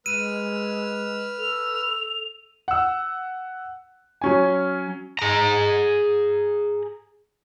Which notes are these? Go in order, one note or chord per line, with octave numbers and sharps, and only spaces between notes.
G#3 B4 E6 F6 D#7
A4 F7
F#5 E6
F#3 C#4 G#5
G#4 A#5